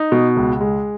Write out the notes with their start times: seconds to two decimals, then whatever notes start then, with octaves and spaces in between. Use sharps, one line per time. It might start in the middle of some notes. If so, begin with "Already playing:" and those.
Already playing: D#4
0.12 B2
0.36 C#2
0.61 G#3